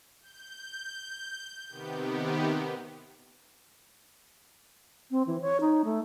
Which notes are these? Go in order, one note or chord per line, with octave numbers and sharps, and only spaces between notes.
G6
C3 D#3 B3 G4
C4
E3
C#5
D#4
A3